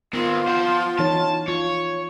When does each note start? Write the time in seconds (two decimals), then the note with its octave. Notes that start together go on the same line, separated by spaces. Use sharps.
0.13 D#3 B3 C4 F4
0.47 F3 C5 F#5
0.99 E3 D#4 C#5 A5
1.48 F4 C#5